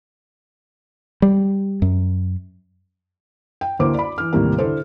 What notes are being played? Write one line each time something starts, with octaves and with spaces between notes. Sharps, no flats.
G3
F#2
G5
D2 A#3 E4 C5 D6
D5 B5
E3 F6
D#2 A2 C3 G3 A#3
D3 E4 A4 C5